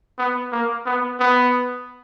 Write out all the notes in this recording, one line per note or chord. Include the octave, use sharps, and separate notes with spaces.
B3
A#3
B3
B3